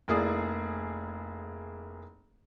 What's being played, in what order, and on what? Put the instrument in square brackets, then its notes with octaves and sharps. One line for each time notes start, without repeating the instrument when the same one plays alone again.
[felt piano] F1 A#3 E4 G#4 D5 D#6